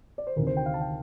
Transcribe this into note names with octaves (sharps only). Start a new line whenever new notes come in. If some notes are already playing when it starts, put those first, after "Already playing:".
D5
C5
D2 C3 D#3 A#4
C5
G5
F5
A5
G5